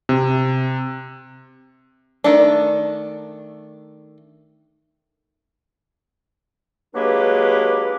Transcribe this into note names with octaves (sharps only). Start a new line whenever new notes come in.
C3
D#3 A3 D4
F#3 G#3 A#3 D4 G4 B4